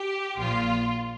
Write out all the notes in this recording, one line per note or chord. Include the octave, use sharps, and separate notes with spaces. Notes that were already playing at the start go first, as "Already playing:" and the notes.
Already playing: G4
A#1 A#2 F3 F4